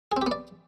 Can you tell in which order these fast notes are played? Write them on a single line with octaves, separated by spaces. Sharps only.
G#4 C4 G4 B3 D5